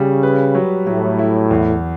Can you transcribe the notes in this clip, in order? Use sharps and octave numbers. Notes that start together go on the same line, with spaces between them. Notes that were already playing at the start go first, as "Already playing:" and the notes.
Already playing: C#3 G3
B4
F#3
A2 F#3
E4
E2